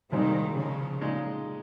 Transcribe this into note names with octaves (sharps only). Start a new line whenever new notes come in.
C2 A#2 D#3 G3 G#3 C4 D#4
C#3 F3
A#2 G#3 D#4